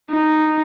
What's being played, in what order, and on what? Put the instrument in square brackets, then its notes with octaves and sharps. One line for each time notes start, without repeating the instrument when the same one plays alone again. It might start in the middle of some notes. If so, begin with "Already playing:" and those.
[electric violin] D#4